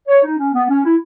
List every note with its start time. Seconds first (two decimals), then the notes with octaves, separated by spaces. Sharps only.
0.08 C#5
0.23 D#4
0.38 C#4
0.53 B3
0.69 C#4
0.85 E4